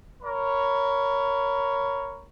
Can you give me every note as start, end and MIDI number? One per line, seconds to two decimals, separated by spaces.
0.23 2.25 70
0.23 2.25 73
0.23 2.25 83